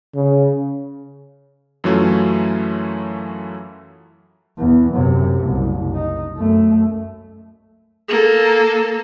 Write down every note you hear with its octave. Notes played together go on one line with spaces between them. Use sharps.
C#3
F#2 E3 F#3 A3 C#4 F4
E2
F#2 C3
F#1 C2
D#4
F#2 A3
A#3 A4